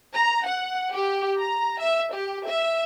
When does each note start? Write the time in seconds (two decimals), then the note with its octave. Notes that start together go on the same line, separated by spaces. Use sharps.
0.13 A#5
0.45 F#5
0.92 G4
1.39 A#5
1.80 E5
2.14 G4
2.47 E5